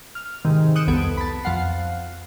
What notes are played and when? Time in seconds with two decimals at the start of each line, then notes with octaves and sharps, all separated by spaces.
0.15 F6
0.45 G#2 C3 D#3
0.76 D#6 F#6 G6 C#7 D7 E7
0.87 C2 F2 B3 A4 G#6 D7
1.17 A5 B5
1.44 F2 F3 F5 F#5 C7